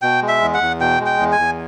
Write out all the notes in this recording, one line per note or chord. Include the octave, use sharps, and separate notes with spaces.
B2 G5
G#3
E5
E2
F#5
E2
B2 G5
G#3
G5
E2
G#5
E2